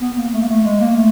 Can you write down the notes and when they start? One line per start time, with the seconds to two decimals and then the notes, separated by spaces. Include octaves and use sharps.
0.01 B3
0.17 A#3
0.33 A3
0.41 A#3
0.49 A3
0.64 G#3
0.80 A#3
0.96 A3